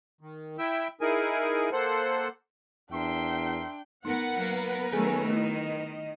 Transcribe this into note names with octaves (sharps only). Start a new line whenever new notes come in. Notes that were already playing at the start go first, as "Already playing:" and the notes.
D#3
E4 E5 G5
D#4 E4 G#4 A#4 G#5
A#3 A4 C5 F#5
E2 D4 A#4 E5 G5 C6
B3 D#4 A#4 B4 F#5
F#3 A#3
D#3 F#3 A3 C#4 G#4 A4 G#5
A3 E4 D#5